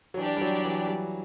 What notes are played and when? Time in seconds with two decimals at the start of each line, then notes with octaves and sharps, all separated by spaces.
0.14 F#3
0.17 E3 D4 G4 D5
0.37 G3
0.41 F#3
0.65 E3
0.87 G3